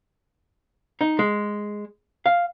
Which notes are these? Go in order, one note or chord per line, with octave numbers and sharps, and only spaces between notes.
D#4
G#3
F5